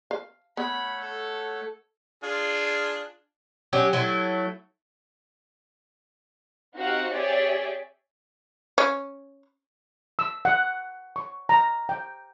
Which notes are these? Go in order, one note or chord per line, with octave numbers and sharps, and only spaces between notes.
F5
A3 B3 C#5 F#5 B5
A4
D4 F4 G#4
F#3 C#4 G4
F#3 A3 E4
C4 D#4 F#4 G4 F5 F#5
G4 G#4 C#5 D5 E5
C#4
E6
F#5
C#6
A#5
G5